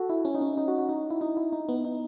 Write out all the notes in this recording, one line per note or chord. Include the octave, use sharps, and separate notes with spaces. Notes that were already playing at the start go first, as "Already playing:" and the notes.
Already playing: F#4 A4
E4
C#4
D#4
C#4
D#4
F#4
F#4
D#4
E4
D#4
E4
D#4
B3
D#4